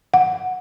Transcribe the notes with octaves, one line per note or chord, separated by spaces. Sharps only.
F#5